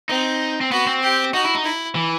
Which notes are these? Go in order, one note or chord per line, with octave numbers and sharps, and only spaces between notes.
C4 D#4
C4
B3 F#4
C4
G4
D#4 F#4
E4
D#4
E4
E3